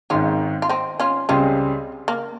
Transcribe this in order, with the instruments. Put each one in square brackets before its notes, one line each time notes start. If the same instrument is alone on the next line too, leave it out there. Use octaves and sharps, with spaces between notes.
[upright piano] G#1 G#2 D#3 [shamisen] C#4 F4
[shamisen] F4
C4 D#4
C#4 F4
[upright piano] C#2 C#3 G3 C4 [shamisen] C#4 F4
[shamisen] A#3